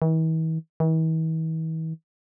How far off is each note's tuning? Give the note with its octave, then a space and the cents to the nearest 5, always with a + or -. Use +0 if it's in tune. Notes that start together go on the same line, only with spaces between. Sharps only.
E3 -45
E3 -45